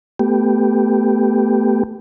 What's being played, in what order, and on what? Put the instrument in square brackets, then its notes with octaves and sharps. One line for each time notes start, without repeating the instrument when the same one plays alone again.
[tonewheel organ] A3 B3 G4